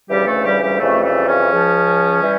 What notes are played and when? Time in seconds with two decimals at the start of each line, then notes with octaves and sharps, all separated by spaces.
0.09 D2 C#3 E3 G3 G4
0.27 A3 A4
0.45 G3 G4
0.62 G3 G4
0.80 F2 C#3 E3 G3 A3
1.03 A3
1.27 C#3 C#4
1.50 C#2 C#3 F3
2.22 E3 G3